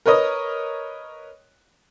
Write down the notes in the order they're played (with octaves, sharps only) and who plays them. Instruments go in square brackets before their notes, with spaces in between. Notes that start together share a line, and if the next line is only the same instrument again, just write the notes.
[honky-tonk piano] A#4 B4 C#5 D#5 D#6